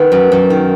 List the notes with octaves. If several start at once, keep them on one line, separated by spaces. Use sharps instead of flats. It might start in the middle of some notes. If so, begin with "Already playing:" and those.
Already playing: D#3 B3
F#2
F#2
D#3